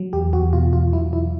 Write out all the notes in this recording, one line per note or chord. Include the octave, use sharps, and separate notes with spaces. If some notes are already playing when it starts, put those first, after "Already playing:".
Already playing: F#3
E2 G4
E2 F#4
B2 F4
E2 F4
F#3 E4
E2 E4